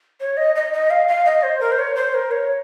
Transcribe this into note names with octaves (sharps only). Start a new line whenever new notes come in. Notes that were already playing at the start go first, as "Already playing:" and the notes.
C#5
D#5
D#5
D#5
F5
F5
D#5
C5
A#4
C5
C#5
C5
A#4
C#5